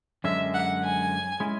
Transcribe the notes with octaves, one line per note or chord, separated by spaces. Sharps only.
F#2 D3 G#3 C#4 E5
F#5
G#5
G#3 C#4 E4